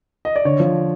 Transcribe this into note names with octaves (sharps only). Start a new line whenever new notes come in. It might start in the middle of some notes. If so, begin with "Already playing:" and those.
D#5
D5
D3 C#5
F3